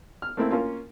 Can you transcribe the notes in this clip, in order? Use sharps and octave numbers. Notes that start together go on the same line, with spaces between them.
F6
A3 A#3 C4 E4
A#3 C#4 F4